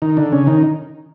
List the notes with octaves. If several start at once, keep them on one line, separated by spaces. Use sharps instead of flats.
D#3 D#4
D3 D4
C#3 C#4
D#3 D#4